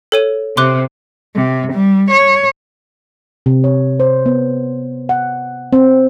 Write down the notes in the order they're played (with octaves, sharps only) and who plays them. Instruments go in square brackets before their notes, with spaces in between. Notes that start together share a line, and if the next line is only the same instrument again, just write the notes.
[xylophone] A4 C#5 D#7
[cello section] C3 [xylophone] C6 D6 F#6
[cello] C3
G3
C#5
[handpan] C3
C#5
C5
B3
F#5
C4